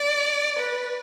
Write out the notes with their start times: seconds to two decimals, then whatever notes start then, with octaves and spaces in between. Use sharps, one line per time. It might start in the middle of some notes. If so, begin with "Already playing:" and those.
Already playing: D5
0.59 B4